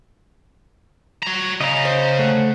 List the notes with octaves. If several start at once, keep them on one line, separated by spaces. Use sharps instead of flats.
F#4 A#5
C#3 D#5 A#5
C5
A3 F#5